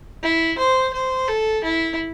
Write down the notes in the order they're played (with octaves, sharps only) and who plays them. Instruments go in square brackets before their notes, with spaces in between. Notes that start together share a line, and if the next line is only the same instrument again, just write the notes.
[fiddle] E4
C5
C5
A4
E4